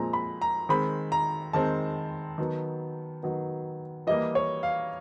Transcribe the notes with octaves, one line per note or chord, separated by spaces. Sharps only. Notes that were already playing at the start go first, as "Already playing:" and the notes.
Already playing: A#2 F3 G#3 C4 G#5 A#5
B5
A#5
D#3 G#3 C4 B5
A#5
D#3 G#3 C4 A5
D#3 F#3 B3
D#3 F#3 B3
E3 G3 A#3 D#5
C#5
F5